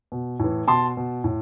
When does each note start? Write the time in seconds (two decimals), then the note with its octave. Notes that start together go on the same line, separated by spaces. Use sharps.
0.12 B2
0.40 A2 E3
0.68 B2 A5 C6
0.97 B2
1.24 A2